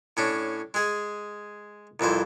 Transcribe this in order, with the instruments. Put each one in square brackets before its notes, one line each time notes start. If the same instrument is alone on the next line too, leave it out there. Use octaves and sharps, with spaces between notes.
[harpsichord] A2 C#4 D4
G#3 G#4
C2 F2 E3 C5